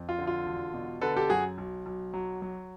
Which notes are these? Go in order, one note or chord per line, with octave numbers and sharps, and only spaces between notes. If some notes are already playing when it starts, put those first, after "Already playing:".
Already playing: F2
F4
D3
F4
E1
B2
D3 A4 B4
G4 A4
F#2 F#4 G#4
B1
B1
F#3
F#3